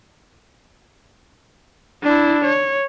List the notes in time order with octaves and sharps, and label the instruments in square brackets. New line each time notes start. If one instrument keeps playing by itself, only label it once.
[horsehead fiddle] D4 E4
C#5